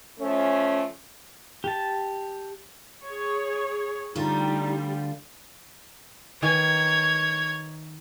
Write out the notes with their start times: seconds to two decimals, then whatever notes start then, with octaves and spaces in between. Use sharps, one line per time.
0.19 F3 A3 C#4
1.64 G4 A5
3.06 G#4 C#5
4.15 D2 D3 G3 D#4 F4
6.42 D#3 B4 C#5 G#5 G#6